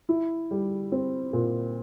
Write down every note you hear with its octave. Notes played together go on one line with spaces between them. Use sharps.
E4
G3
C4
A#2